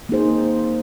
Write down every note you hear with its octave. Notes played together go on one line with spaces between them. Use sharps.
A#3 D#4 G#4 C5